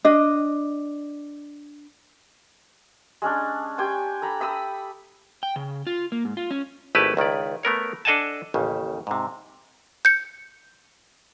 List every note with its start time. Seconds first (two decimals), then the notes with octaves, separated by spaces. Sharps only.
0.05 D4 D#5
3.22 G#3 C#4 D4
3.78 G4 G5 G#5 C6
4.22 A4 A#5 B5
4.40 E5 B5 D#6 E6
5.43 G5
5.56 C#3
5.87 F4
6.12 A#3
6.25 G#2
6.37 F4
6.51 C#4
6.95 G#1 A3 E4 G4 B4 A5
7.17 C#2 D#3 E4 D5
7.63 A3 B3 A#4 C#5
8.05 D4 A4 D#5 F#5 G#5 A5
8.54 A1 D#2 C#3
9.07 G#2 C3
10.05 G6 C#7